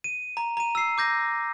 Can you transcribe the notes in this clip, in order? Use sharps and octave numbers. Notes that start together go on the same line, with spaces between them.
D#7
A#5
A#5 D#7
E6 C7
D6 G6 A#6